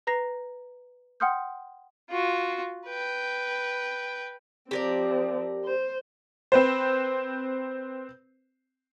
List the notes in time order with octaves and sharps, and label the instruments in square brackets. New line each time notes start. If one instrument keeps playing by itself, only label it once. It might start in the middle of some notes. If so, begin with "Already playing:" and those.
[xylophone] B4 A#5 A#6 C7
F#5 G5 C6 D#6 F6 G6
[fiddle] F4 F#4
B4 G5
[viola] F3 C4 [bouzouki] G4 A#4 D5
[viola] C5
[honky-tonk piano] C4 B4 C5